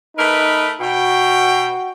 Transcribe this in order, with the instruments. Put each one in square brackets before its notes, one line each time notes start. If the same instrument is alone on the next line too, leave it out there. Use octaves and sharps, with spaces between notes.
[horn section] A3 A#4 B4 [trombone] D#4
[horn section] B2 G5 [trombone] F#4